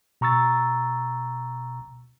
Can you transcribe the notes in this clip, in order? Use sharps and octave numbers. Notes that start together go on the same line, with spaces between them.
B2 A#5 C#6 E6 A6